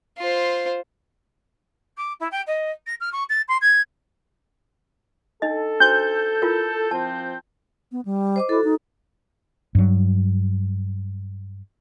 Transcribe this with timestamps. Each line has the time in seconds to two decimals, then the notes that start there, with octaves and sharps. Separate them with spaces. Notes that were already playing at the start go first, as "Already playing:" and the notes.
0.18 F4 C5
1.97 D6
2.20 E4
2.31 G5
2.46 D#5
2.86 A#6
3.00 F6
3.12 C#6
3.29 A6
3.48 C6
3.61 G#6
5.42 D4 D#4 A4 D#5
5.80 D4 F#4 C5 G6
6.42 E4 F4 A#4
6.91 F3 C4 A5
7.92 B3
8.05 G3
8.36 C5 D#5 D6
8.49 E4 F#4 A4
8.64 D#4
9.75 G2 F#3